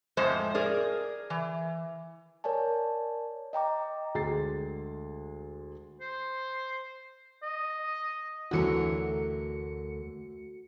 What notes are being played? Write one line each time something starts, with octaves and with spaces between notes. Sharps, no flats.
F2 A2 G#3 C5
G#4 A#4 D5
E3
A#4 C#5 D5 G#5 A5
D#5 G5 A#5 D6
D2 G#3 A6 C7
C5
D#5
D2 D3 E3 F#3 A3 F#4 A#4 C#7